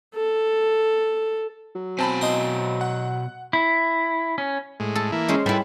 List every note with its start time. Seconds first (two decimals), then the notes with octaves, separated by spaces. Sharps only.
0.15 A4
1.75 F#3
1.99 B2 C4 G#5 A5 B5
2.21 D#4 C6 D#6
2.81 F#5
3.53 E4
4.38 C#4
4.80 A2 G#3
4.95 A4
5.12 E3 A#3 E4
5.28 G#3 C#4 C5
5.46 G3 E4 A4 B4